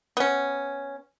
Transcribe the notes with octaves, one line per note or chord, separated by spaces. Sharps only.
B3 C#4